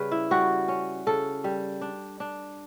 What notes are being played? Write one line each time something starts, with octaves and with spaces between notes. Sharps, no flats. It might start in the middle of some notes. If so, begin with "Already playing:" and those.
Already playing: C#3 G3 B4
E4
G3 F#4
C#4
C#3 A4
G3
D4
D4